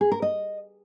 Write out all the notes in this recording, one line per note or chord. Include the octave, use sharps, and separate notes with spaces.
G#4
A#4
D#5